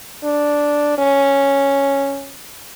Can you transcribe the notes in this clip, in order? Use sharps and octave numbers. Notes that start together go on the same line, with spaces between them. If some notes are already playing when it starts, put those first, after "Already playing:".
D4
C#4